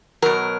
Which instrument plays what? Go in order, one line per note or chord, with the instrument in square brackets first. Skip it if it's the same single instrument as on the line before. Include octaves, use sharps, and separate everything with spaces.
[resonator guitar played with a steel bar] B2 F#3 A#4